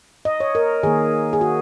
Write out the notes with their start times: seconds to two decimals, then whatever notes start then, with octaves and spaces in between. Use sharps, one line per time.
0.25 D#5
0.40 C#5
0.55 A#4
0.83 D#3 A#3 G#4
1.33 G#4
1.41 F#4